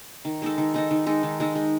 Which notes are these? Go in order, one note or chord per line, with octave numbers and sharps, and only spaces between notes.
D#3
G#3 D#4 A4
D#3
G#3 D#4 A4
D#3
G#3 D#4 A4
D#3
G#3 D#4 A4
G#3